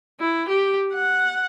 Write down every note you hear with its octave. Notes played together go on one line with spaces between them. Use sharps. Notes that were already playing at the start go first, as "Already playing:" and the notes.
E4
G4
F#5